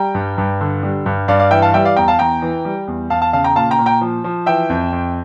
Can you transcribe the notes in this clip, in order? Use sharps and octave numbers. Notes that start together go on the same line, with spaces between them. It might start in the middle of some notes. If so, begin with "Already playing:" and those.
Already playing: G3 G5 A#5
G2
G2
D3
G3
G2
G2 D5 F5
D5 F5
E3 E5 G5
F5 A5
G3 E5 G5
D5 F5
E2 G5 A#5
F5 A5
E2 G5 A#5
E3
G3
E2
E2 F5 A5
F5 A5
C#3 F5 A5
G5 A#5
A#2 F5 A5
G5 A#5
A#2
G5 A#5
F3
F3
E3 E5 G5
F2
F2